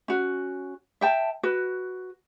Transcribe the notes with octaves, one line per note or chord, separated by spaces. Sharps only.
C#4 F#4
E5 G5 A5
F#4 B4